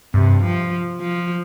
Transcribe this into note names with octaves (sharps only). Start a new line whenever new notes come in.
G2 C3
F3
F3